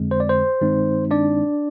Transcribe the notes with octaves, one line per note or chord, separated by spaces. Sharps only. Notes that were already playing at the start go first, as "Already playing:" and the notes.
Already playing: F2 D3 G#3 C4
C5
D5
C5
G2 D#3 G#3 C4 D#4
D4 D5